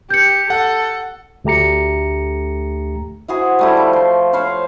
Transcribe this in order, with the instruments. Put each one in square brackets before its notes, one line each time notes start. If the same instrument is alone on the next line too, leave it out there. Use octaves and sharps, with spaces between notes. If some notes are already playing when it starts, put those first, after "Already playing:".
[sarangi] G4 [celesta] G6 C#7
[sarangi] A4 [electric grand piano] F#5
[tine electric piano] D2 A3 G4 A#5 C#7
[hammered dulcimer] E4 F#4 G#4 C5
G3 A3 E4
F3
C5
C5 C#5 F5 B5